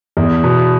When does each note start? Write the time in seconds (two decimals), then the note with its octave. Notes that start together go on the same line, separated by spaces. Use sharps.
0.17 E2
0.44 B2